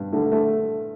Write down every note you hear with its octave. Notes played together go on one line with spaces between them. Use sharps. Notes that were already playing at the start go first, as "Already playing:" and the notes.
Already playing: G2
D3 A3
A3